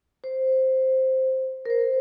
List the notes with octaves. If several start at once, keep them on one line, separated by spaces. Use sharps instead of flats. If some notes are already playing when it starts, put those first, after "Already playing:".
C5
A#4
C5